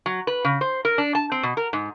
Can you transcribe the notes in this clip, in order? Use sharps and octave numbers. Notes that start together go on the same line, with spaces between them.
F#3
B4
C#3
C5
A#4
D4
A5
C4
B2
A#4
G#2